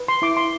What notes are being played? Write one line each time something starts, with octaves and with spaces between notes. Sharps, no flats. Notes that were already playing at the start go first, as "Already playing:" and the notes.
Already playing: B4
C6
E4 D6
C6